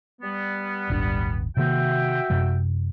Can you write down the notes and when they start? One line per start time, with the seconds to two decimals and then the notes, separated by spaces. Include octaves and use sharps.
0.22 G3 B3
0.90 D#1 G#1 D4
1.57 C3 D#3 A#3 F#4 E5 G5
2.30 F#2 C3 G#3